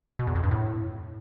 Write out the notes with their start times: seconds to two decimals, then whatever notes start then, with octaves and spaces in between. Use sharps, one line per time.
0.19 B2
0.27 E2
0.35 F2
0.43 G2
0.51 A2